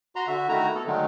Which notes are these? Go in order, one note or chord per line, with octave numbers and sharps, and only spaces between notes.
F#4 A#5 C6
D3 F#4 E5
D#3 A3 E4 F#4 A#5
B3 A4
D3 D#3 F#3 G#3 A3